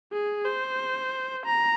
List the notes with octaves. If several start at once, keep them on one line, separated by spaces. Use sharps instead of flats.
G#4
C5
A#5